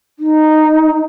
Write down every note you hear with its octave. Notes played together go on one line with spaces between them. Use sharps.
D#4